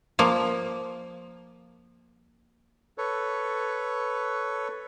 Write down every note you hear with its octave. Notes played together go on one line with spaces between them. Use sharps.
F3 A#3
A4 B4 C#5